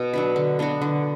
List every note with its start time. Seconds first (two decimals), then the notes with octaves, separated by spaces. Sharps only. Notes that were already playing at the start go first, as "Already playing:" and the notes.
Already playing: B2
0.13 F#3 D4 B4
0.36 D3
0.59 B3 D4 F#4
0.82 D3